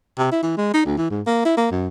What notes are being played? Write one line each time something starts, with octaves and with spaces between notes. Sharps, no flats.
C3
E4
E3
G#3
D#4
D2
E3
G#2
A#3
E4
A#3
F#2